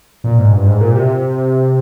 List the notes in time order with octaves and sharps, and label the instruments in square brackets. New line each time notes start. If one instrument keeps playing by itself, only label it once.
[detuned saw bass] A#2
G#2
G2
G#2
A#2
C3